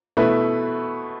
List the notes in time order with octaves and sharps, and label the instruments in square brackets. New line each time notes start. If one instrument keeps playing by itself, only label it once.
[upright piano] B2 A3 E4 B4